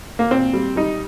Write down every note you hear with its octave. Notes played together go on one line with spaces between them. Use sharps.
A#3
A#2 C4
G3
G3 D#4